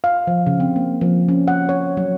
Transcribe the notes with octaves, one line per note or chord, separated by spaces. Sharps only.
F5
F3
C#3
C4
A#3
F3
C#4
F#5
C#5
F#3